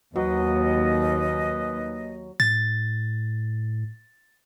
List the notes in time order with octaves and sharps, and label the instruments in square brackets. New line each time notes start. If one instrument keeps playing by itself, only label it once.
[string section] D#2 [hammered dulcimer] F#3 [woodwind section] B4 D#5
[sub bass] A2 [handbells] A6